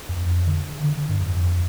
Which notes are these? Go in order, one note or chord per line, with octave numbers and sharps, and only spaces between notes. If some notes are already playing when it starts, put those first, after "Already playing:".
F2
D3
D3
D3
G2
F2